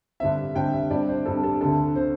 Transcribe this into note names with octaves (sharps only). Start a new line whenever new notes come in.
G2 D3 C4 E5
G2 D3 C4 G5
E5
G2 G3 C4 D5
C5
G2 G3 C4 A4
A4
D2 D3 C4 A4
D3 C4 C5